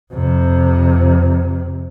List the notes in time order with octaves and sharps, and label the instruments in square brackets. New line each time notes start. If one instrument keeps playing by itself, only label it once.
[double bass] F2 C3